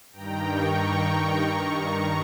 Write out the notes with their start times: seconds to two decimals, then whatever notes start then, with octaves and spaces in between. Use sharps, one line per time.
0.12 G2 D#3 G5 A#5
0.45 A#5 C#6
1.45 G2 D#3